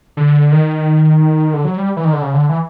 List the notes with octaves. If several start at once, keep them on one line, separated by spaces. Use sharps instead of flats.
D3
D#3
D3
F#3
G3
E3
D#3
D3
C#3
D3
E3